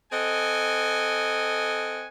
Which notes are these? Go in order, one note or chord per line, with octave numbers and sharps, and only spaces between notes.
C4 A4 D#5 F#5 G#5